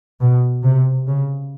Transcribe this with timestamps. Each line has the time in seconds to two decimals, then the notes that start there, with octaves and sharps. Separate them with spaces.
0.21 B2
0.63 C3
1.07 C#3